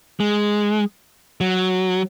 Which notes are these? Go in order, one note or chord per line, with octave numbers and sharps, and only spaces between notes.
G#3
F#3